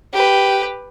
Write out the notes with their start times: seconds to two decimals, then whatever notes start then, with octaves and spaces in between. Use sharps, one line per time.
0.13 G4 B4